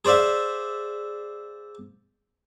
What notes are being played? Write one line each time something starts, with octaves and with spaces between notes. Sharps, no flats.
G#4 C5 D5 E5 F5